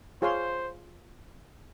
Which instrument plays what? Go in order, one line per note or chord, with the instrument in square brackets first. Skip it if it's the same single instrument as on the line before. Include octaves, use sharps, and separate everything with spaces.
[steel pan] F4 G#4 C#5 F5 C6 [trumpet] C5